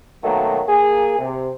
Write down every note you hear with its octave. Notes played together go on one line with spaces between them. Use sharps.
B2 D#3 F#3 A3 A#3
A#3 G#4
C3